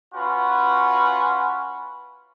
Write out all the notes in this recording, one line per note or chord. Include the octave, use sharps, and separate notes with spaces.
C#4 F4 F#4 B4